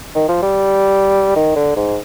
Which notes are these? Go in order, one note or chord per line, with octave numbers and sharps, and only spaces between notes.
D#3
F3
G3
D#3
D3
G#2